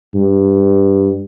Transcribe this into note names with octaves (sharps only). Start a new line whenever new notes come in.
G2